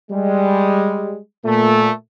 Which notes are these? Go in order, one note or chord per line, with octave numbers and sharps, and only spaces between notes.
G3 G#3
A#2 A3